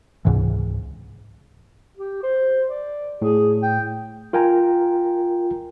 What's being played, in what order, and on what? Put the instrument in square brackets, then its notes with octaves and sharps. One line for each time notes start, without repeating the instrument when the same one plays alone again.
[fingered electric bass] C#2 G#2 C3 E3
[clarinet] G4
C5
D5
[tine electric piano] A2 [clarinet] G#4
[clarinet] G5
[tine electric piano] F4 A#4 G5 G#5 A#5